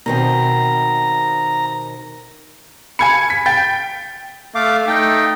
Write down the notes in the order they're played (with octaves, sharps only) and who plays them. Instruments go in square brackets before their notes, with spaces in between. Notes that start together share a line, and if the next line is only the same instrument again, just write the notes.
[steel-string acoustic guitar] B2 D#3 C4 [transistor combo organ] A#5
[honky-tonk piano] G#5 G#6 C#7 [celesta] B5
[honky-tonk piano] B6
[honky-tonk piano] G5 [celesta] A6
[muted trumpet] A3 [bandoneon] F5 D6
[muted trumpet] A3 [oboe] D#4 [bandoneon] G5